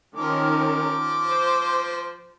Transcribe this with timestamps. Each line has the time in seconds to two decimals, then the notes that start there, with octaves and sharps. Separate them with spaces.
0.16 D#3 F3 C#4 A#4 D6
1.28 C5